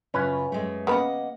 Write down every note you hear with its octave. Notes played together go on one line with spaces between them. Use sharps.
F#2 C#3 C#4 F4 B4
F#2 G#3 A3
C#3 A#3 B3 D#5 F#5 B5